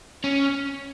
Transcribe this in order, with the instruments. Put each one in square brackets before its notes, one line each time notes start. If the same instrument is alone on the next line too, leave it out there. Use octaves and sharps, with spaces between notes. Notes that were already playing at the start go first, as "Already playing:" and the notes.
[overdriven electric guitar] C#4